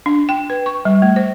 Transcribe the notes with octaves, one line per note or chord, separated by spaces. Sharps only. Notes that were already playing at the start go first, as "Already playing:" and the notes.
D4
G5
B4
C#6
G3
A3
C5